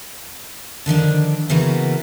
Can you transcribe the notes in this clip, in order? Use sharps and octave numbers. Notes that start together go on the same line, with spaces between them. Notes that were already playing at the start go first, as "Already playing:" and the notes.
D3 D#3 F3 D4
C#3 E3 F#3 A#3 B3 B4